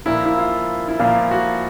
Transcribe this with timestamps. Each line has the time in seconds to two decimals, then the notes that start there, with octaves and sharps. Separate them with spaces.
0.06 A#2 F3 A#3 E4
0.26 E4
0.38 F4
0.88 E4
0.99 A#2 F3 A#3 F4
1.31 F#4